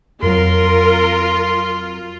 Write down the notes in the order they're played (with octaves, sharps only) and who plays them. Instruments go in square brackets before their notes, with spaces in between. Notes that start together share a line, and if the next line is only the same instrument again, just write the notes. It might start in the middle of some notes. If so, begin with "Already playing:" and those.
[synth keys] F2 F#3 [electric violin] F4 [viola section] A#4 [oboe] C6